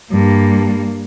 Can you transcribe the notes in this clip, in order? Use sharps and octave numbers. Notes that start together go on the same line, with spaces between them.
G2 A#3